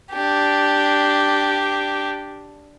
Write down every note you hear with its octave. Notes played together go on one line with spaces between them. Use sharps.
D4 G4